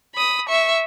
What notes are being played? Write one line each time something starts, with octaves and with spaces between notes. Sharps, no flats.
B5 D#6
E5 C#6